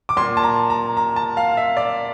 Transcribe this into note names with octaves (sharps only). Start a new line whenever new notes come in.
D6
A#2 C6
A5
A#5
A#5
A#5
A5
F5
E5
D5